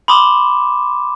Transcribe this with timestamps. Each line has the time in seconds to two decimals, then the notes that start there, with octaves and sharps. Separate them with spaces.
0.08 B5 C6 D6 D#6 E7